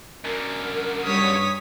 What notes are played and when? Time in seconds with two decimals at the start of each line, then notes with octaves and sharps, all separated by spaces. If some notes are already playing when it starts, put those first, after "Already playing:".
0.25 F#2 D3 A#4
1.05 G2 C#5 D#6 B6